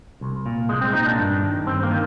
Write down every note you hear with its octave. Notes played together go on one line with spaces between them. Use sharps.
C2
A#2
C2 G#3
C4
A#2 D#4
D4
G2
D#3
G2 C4
A#3
D#3